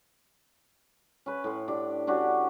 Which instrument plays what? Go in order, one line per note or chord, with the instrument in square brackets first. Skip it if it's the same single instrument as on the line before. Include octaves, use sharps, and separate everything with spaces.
[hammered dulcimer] C#4 B4
A2 C6
D4 G4
C#4 D4 F#4 G4